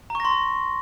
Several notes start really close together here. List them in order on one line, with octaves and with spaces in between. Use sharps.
A#5 C#6 A#6 C6